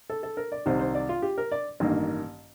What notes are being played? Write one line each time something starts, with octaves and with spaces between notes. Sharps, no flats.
A4
A4
A#4
D5
C2 C3 D#3 C5
C5
D5
F4
G4
A#4
D5
A1 G2 D#3 A#3